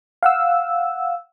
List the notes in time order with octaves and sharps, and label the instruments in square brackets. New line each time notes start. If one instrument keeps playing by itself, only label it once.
[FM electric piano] F5 F#5 E6